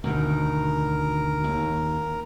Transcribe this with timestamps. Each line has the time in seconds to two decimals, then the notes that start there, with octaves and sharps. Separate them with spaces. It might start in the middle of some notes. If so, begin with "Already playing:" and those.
0.04 D2 B2 D#3 A#4
1.44 D#2